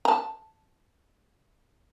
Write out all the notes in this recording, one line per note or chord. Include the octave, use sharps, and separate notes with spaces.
A5 A#5